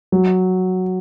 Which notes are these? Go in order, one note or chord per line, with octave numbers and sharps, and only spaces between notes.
F#3